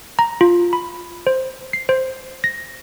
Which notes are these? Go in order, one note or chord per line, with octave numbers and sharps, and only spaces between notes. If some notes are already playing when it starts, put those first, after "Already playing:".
A#5
F4
B5
C5
C7
C5
A#6